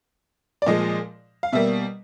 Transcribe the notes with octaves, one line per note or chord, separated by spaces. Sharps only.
D5
A#2 F3 G#3 D#5
F5
B2 G3 A#3 E5